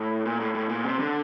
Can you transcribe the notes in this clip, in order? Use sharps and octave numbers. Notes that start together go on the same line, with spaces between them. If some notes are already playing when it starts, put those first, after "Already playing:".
Already playing: A2
A#2
A2
A2
A#2
C3
D3